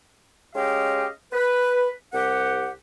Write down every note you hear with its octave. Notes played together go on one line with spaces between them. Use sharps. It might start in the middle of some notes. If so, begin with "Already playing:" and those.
G#3 C#4 G4 D#5 F5 G5
B4
C2 G4 F#5